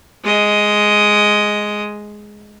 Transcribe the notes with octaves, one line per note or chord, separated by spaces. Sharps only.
G#3 D#5